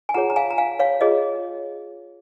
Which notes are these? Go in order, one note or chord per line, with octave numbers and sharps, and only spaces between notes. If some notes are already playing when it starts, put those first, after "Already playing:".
G#5
F4 G#4 C#5 F#5 A#5
A#5
F5 G#5
A#5
F5 G#5
C#5 F5
F4 G#4 C#5 D#5